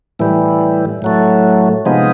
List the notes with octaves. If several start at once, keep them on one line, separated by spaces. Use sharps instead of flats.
A2 E3 G3
A2 F#3 A3
C3 F3 G#3 B3 D#4